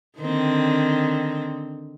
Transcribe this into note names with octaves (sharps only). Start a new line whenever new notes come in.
D3 D#3 C4